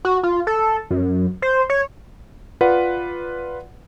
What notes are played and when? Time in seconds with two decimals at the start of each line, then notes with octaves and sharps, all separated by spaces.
0.05 F#4
0.23 F4
0.47 A4
0.91 F#2
1.42 C5
1.70 C#5
2.61 F4 B4 D5 F#5